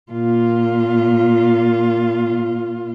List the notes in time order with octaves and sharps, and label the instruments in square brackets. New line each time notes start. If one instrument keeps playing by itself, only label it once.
[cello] A#2 F4